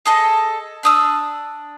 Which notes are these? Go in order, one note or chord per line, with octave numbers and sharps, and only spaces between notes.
G#4 A4 D#5
D4 D#6 E6